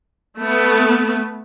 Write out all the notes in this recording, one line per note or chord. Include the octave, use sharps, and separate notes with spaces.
A3 B3